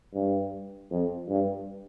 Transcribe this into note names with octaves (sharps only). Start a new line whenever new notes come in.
G2
F2
G2